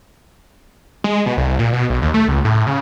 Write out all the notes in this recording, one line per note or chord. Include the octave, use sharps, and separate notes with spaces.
G#3
B2
C2
A#2
B2
B1
D#2
A3
C#2
A2
C#3